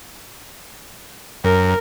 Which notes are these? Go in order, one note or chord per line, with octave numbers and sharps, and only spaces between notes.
F#2 A#4